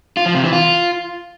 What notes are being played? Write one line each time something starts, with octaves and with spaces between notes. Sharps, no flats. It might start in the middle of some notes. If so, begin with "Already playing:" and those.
F4
F3
C3
E3
F4